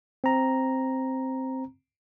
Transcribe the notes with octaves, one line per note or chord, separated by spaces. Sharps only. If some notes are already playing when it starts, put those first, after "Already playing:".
C4 A#5